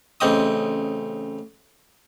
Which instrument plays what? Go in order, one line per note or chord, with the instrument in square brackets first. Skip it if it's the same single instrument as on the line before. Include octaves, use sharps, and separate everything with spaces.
[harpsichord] A1 C#3 C4 D#5 D#6